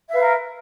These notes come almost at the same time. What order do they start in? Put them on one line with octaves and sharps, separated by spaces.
E5 F5 B4 A#4